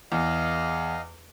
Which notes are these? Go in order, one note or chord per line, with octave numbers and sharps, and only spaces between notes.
E2 D#5 F5